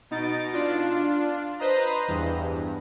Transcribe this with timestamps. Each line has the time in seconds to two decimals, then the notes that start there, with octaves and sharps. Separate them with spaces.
0.11 B2 D#4 A6 D7
0.53 D4 F4
1.60 B4 C5 D#5 A#5
2.08 E2 G2